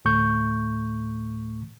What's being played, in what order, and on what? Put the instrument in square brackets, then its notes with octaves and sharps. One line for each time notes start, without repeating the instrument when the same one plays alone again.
[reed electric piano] D2 A2 A3 C#6 G6